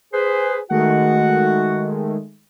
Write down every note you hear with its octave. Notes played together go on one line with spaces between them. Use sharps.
G#4 B4 C5
D#3 G#3 A3 F#4 F#5